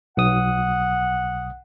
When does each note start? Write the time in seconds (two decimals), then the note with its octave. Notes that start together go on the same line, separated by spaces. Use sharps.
0.17 B1 F#5 D#6